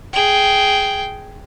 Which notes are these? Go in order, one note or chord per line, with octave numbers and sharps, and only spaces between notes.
G#4 G5